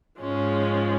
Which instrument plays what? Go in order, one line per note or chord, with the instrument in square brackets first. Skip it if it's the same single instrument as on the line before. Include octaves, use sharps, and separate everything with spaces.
[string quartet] G#2 F3 G#3 C#4